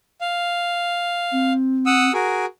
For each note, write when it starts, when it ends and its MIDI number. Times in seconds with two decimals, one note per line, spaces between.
0.21 1.53 77
1.32 2.10 60
1.86 2.12 78
1.86 2.12 87
1.86 2.12 88
2.13 2.45 66
2.13 2.45 68
2.13 2.45 70